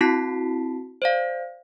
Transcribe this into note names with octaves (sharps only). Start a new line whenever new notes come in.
C4 E4 F#4 A5 B6 C7
C5 D5 F5